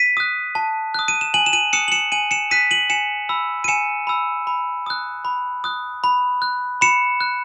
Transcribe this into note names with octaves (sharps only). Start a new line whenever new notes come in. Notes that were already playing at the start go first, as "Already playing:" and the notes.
Already playing: B6 D#7
D#6 F#6
A5
D#6 F#6
D#7
E7
G#5 D#7 F#7
E7
D#7 F#7
D#6 F#6 C#7 E7
F#7
C#7 E7
G#5 D#7 F#7
C#7 E7
D#6 F#6 B6 D#7
D#7 F#7
G#5 C#7 E7
B5 E6
D#7
G#5 C#7 E7
B5 E6
B5
D#6 F#6
B5
D#6 F#6
B5
F#6
B5 C#7 E7
F#6